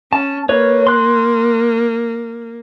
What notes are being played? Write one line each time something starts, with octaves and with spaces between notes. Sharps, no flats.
C#4 A5
A#3 B4 C#5
C6 F#6